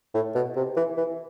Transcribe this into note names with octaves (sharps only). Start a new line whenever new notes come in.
A2
B2
C3
E3
E3